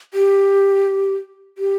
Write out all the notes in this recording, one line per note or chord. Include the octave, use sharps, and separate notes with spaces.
G4
G4